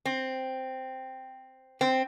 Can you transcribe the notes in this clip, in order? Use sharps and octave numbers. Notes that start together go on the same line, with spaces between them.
C4
C4